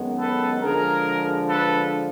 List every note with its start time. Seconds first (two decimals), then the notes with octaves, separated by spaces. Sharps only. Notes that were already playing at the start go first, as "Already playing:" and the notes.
Already playing: F#2 D#3 G#3 B3
0.18 A4 B4
0.61 D3 F3 G#3 G#4 A#4
1.48 A4 B4